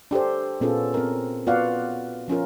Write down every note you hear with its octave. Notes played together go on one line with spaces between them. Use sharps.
D4 G4 A4 C5
A#2 B3 C#4 F4 G#4 A4
C4 A#4
B3 F4 F#4 D5 F5 F#5
F3 C#4 F4 A#4